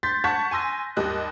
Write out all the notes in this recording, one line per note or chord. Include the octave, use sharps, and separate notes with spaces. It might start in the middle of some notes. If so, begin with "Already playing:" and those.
C6 G6 A6 B6
F#5 A5 C#6 F#6 G#6 B6
G#5 C6 E6 A#6
D#2 G3 D#5 F#6